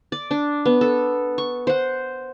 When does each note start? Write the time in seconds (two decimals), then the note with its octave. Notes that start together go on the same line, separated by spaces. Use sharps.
0.12 D5
0.31 D4
0.66 B3
0.81 A4
1.38 C#6
1.67 C5 F#5